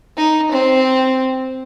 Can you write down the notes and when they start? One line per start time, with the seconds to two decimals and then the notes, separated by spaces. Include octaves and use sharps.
0.17 D#4
0.51 C4